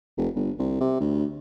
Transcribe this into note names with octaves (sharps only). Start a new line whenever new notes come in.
F1
G1
C2
C3
D2